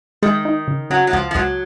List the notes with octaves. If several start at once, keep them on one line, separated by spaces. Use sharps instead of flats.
D#3 G#3
D#4
C#3
C#3 F#3
F#3
C#2 F3
F3
C#2 F#3